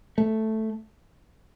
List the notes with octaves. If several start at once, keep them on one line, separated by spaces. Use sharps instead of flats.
A3